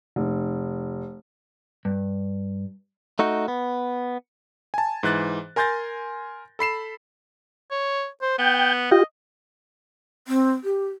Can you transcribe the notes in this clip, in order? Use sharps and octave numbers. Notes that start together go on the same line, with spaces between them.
F1
G2
A3 D#4 F#4
B3
G#5 A5
G#2 E3 F#6 A6
A#4 G#5 C6 G6 A6 A#6
A4 B5 C7 E7
C#5
C5
B3 G5
F4 G4 D#5
C4
G4